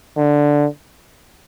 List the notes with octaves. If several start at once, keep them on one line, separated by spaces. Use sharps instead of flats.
D3